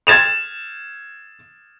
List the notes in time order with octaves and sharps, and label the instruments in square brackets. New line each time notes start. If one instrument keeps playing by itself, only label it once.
[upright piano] G#6 A6 E7 F7